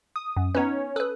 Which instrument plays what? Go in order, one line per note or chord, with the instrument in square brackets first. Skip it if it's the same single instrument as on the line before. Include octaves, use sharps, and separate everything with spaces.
[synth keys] D#6
[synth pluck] F#2
[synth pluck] B3 D#4 B4 [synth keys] C#4 C#5
[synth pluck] A4 B4 [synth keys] D#6 F#6